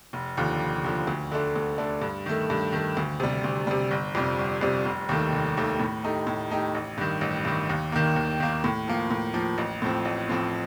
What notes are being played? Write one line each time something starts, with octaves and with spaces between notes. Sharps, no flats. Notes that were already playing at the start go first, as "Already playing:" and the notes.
F1
D#2 D3 F3
F1
D#2 D3 F3
D2
D3 A3 D4
D2
D3 A3 D4
G2
D#3 A3
G2
D#3 A3
D2
C3 G3
D2
C3 G3
G1
F2 C3 G3
G1
F2 C3 G3
F1
D#2 D#3 A3
F1
D#2 D#3 A3
A2
A3 D#4 G4
A2
A3 D#4 G4
A1
G2 D#3
A1
G2 D#3
D#2
D#3 A#3
D#2
D#3 A#3
A2
F3 A#3
A2
F3 A#3
A1
A2 F3 C4
A1
A2 F3 C4